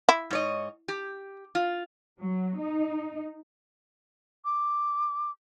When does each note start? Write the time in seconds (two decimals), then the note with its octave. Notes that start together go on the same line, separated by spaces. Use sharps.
0.09 E4
0.31 G#2 C#5 D#5
0.88 G4
1.55 F4
2.20 F#3
2.60 D#4
4.44 D6